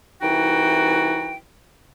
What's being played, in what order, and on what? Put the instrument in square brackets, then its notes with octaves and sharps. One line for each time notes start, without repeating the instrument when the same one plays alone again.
[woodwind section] C2 E3 D#4 F#4 G5